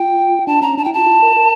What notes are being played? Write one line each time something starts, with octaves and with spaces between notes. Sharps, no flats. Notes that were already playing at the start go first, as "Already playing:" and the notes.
Already playing: F4 G5
D4 A5
C#4 A#5
D4 A5
E4 G5
F4 A5
F4
A#4
A#4